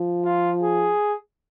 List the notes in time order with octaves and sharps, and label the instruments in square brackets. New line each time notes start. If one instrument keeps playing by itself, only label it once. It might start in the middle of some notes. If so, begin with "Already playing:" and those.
Already playing: [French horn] F3
[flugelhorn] F4
G#4